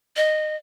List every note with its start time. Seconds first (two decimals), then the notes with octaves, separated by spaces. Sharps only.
0.17 D#5